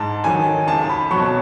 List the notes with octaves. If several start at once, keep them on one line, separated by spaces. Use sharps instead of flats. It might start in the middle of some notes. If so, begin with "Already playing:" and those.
Already playing: G#2 A5
D#3 F#3 G#5
C#2 A5
B5
B2 F#3 C#6